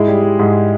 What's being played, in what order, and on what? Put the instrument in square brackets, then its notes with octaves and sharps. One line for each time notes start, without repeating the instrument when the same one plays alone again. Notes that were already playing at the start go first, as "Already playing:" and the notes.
Already playing: [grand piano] G#2 G#3 E4 G#4
G3
G3
G#2